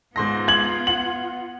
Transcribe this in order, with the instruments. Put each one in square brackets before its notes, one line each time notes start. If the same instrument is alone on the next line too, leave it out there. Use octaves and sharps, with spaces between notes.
[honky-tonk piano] G#2 C6 A#6 [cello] B3 F4
[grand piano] G#6 F#7
[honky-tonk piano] F#5 [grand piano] F#7